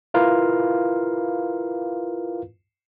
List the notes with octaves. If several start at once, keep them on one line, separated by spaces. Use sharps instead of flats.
E4 F4 A#4 B4 F5